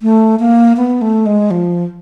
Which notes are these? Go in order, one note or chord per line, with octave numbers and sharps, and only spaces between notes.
A3
A#3
B3
A3
G#3
F3